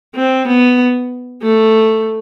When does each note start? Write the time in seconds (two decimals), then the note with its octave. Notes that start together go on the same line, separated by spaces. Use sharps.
0.15 C4
0.48 B3
1.42 A3